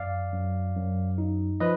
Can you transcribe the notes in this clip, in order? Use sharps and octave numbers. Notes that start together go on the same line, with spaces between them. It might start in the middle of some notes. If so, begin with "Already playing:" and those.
Already playing: F#2 D5 F5
F#2
F#2
D#4
F3 B4 D#5